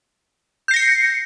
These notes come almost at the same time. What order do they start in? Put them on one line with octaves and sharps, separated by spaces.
G6 C7 A#6 C#7